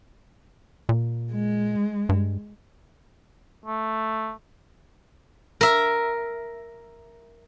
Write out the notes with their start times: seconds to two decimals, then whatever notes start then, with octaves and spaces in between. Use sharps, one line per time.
0.89 A#2
1.32 G#3
2.09 G2
3.66 A3
5.61 A#4 E5